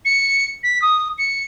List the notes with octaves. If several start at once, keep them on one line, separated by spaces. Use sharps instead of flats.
C#7
B6
D#6
C#7